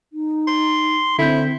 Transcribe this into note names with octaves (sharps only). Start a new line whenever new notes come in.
D#4
C6
D3 C4 E4 G6